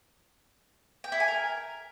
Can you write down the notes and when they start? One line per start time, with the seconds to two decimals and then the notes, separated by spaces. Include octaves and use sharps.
1.04 G5
1.12 E4
1.20 G#5
1.28 A#4